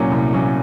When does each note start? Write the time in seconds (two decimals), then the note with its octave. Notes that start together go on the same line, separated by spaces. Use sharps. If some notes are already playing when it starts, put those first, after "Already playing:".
Already playing: C2 A#2 F#3 C#4
0.12 C2
0.33 A#2 F#3 C#4